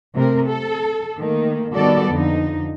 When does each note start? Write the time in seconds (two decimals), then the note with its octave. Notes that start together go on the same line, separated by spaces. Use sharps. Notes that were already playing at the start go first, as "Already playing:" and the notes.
0.15 C3 A3 A#4
0.46 A4
1.18 D#3 A3 A#3
1.73 D#3 G3 B3 F#4 A4 D5
2.10 F2 D3 D#4